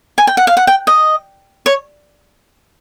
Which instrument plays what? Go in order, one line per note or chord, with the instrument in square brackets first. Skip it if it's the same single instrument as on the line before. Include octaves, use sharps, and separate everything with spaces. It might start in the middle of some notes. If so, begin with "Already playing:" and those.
[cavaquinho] G#5
G5
F#5
F5
F#5
G5
D#5
C#5